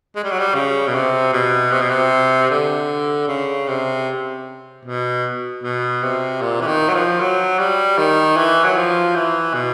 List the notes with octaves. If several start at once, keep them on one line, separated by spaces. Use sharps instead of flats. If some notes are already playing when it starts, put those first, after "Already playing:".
G#3
G3
F#3
G3
C#3
B2
C3
B2
C3
B2
C3
D3
C#3
C3
B2
B2
C3
A#2
E3
D#3
F#3
F3
F#3
G3
D#3
E3
F#3
F3
E3
B2